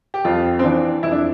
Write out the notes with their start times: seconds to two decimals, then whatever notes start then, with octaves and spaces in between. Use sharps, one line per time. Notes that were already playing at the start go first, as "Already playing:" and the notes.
0.14 G4
0.24 F2 F4
0.59 C4
0.64 E3 D4
1.03 F2 E4
1.12 D4